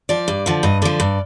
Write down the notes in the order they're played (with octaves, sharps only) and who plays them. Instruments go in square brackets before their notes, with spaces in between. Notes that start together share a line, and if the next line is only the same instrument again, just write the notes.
[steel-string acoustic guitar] F3 D5
G2
D3 F3
G2 D#5
D3 F3 D5
G2